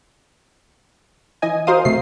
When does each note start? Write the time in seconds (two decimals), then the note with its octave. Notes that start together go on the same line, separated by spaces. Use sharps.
1.42 E3 D#5 G#5
1.67 F#4 A#4 C5 F5 D#6
1.85 C3 A3 C7